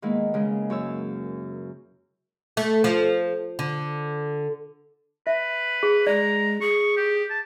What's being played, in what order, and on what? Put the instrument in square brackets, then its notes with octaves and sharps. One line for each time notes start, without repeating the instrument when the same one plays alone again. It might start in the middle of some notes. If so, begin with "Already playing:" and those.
[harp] D#3 G#3 A#3 B3 E4
C#3 G#3
F#2 C#5 E6
[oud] A3
F3
D3
[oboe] B4 [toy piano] E5
[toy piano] G#4
[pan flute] G#3 [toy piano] D5 [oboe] A#5
[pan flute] G#4 [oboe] C#6
[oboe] G4
A5